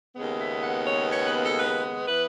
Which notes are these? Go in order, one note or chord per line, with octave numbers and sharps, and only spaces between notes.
D#2 C#3 G#3 B3
E5
F#5
C#5
C#5
B4
A4
B4
E3 B3 B4